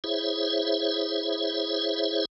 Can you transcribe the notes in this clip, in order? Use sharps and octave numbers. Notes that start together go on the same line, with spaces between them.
E4 G#4 C5 C#5 E5